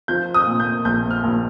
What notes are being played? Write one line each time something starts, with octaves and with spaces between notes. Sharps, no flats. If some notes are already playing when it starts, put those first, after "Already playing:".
F3 G6
D#6
A#2
G6
A#1 G6
F6
A#1